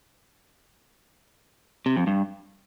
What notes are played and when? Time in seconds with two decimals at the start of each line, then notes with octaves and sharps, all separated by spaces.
1.86 C3
1.96 F2
2.07 G2